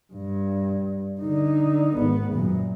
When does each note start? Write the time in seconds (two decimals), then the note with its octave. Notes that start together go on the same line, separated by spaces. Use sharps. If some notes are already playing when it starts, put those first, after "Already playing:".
0.13 G2
1.21 D3 D#4
1.96 G#1 B3
2.33 F#2 A#2